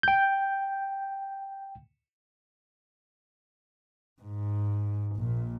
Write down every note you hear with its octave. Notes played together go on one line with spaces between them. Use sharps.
G5 G6
G#2
A#1 A#2